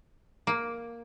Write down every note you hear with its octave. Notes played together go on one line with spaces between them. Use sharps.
A#3